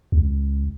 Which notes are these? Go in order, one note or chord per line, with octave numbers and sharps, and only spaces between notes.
C#2